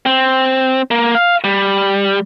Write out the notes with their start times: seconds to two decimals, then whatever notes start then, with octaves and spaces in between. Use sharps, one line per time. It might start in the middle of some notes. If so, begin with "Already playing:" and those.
0.06 C4
0.91 A#3
1.15 F5
1.44 G3